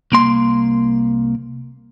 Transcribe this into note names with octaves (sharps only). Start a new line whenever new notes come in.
C2 A#3 C6